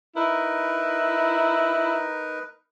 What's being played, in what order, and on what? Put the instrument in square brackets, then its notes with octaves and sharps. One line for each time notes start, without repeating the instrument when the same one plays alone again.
[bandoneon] D#4 A#4 B4 [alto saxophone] E4